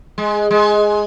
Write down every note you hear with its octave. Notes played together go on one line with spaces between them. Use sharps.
G#3
G#3